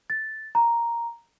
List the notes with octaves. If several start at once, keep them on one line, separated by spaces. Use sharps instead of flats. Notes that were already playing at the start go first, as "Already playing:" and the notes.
A6
A#5